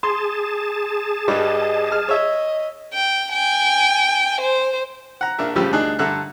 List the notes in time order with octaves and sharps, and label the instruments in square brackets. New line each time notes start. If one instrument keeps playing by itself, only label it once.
[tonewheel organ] G#4 A5 [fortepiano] C6
[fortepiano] G2 G3 [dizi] D#5
[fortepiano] F6
[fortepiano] C#5 E5 [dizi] D#5
[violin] G5
G5 G#5
C5
[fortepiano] F#5 A#5
A#1 D4 A#4 E5
A1 C#3 F3 G3 G4 E6
D2 D4 D#4 G#4 F#6
G2 D3 A4 E5 A#5 F#6